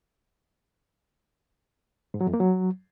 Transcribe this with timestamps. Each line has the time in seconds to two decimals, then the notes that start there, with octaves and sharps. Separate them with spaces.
2.14 G#2
2.21 F#3
2.27 F2
2.34 A#3
2.40 F#3